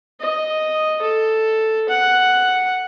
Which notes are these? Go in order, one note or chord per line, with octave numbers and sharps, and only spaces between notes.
D#5
A4
F#5